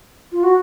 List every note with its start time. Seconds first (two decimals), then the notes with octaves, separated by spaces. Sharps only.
0.32 F4
0.43 F#4